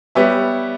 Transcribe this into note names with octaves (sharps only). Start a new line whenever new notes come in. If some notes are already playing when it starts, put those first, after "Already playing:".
G3 B3 G4 C#5 E5